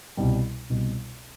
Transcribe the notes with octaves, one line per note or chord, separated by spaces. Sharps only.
C2 B2 G3
C2 B2 G3